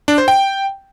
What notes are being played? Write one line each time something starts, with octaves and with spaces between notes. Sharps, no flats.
D4
C5
G5